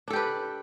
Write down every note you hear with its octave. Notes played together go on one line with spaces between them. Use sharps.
D4 G4 A4 B4